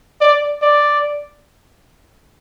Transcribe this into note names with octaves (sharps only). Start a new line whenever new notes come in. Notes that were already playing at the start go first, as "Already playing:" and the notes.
D5
D5